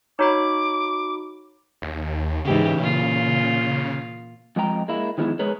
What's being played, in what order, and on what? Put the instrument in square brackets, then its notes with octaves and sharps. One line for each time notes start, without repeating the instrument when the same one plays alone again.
[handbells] D#4 F#4 B5 [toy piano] C#5 A#5 [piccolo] D6
[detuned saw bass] D#2
[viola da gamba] G#2 E3 G4 [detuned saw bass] C#3
[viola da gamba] A#2 F4
[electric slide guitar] F2 F3 G#3 D#5 G5 A#5
G#3 A#3 E4
D#3 F3 G#3 B3 E4
G#3 G#4 A#4 B4 C#5